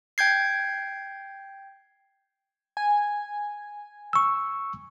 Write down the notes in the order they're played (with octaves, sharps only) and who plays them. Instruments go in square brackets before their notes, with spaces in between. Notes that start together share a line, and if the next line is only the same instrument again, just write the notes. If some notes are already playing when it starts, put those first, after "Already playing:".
[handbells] G5 G6 G#6 C7
[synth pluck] G#5
[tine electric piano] C#6 E6